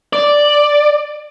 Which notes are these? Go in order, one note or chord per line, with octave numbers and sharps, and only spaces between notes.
D5